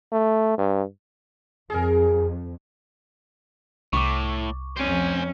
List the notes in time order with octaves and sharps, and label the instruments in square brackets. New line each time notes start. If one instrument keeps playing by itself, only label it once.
[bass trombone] A3
G2
[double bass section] F2 [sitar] G#4 A#4
[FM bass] C2 [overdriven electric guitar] A2 [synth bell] C#6 D6
[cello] F2 C#4 [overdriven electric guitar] C5 G#5